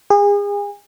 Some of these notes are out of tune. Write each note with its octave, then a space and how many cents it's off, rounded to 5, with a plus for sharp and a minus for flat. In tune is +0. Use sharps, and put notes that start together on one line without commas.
G#4 -35